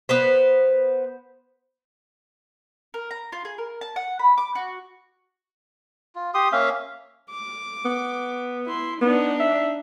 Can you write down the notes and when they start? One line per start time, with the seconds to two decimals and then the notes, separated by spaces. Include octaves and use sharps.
0.09 B3 B4 C5
2.94 A#4
3.11 A#5
3.32 F4
3.45 G#4
3.58 A#4
3.81 A5
3.96 F#5
4.19 B5
4.38 D6
4.55 F#4
6.15 F4
6.34 G4 C6 D#6
6.52 A#3 C#4 E5 F5
7.31 D6
7.85 B3
8.66 E4 C6
9.01 B3 D4 D#4
9.40 E5